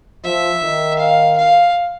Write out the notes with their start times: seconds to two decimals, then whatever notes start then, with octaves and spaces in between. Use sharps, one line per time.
0.24 F3 E5
0.62 D#3
0.99 F5
1.38 F5